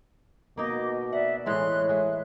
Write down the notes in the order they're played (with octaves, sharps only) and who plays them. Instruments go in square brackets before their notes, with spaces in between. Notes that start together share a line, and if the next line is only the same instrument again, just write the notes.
[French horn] B2 [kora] A#3 D#4 [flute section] D#5 D6
[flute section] D5 E5 [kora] F#5
[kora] A2 E3 G#3 [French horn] C#5 [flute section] C6 F#6
[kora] G#3 [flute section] E5